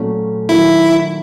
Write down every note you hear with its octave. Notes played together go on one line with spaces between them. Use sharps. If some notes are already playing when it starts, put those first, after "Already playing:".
Already playing: A#2 F#3 A3 C#4
D#3 F#3 A#3 C#4 E4 F4